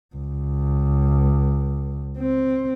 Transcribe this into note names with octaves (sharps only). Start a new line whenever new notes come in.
C#2
C4